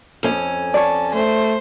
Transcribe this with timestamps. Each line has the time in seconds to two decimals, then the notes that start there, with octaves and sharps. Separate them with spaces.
0.23 F2 C#4
0.74 C#5 D5 A5
1.14 A3 C5